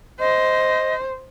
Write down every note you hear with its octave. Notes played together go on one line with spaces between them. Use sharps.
C5 D#5